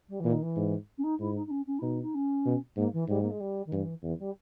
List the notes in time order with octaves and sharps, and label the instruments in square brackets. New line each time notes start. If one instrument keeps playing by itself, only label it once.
[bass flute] G3
[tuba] A#2 [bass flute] E3
[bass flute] D#3
E3
[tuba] G#2
[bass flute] C#4
D#4
[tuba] G#2 [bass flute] E4
[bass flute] D#4
D#4
C#4
C#4
E4
[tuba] B2 [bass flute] D#4
[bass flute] D#4
C#4
[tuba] B2
[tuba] G#2 [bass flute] A#3
[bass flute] E3
[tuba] G#2 [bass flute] G3
[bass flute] A#3
G#3
G3
D#3
[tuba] G2 [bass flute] E3
[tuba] E2 [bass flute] E3
[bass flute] G3